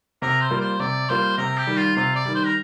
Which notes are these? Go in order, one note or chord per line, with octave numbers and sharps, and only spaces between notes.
C3 A#4
C5
G3 A#3 F4
C5
C3 D5
G3 A#3 F4 C5
C3 A#4
G4
D#3 G3
F4
C3 F4
D5
D#3 G3
C5
A#4